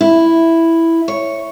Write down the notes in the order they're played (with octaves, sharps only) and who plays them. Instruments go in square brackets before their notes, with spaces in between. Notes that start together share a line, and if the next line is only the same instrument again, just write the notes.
[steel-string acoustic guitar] E4
C#5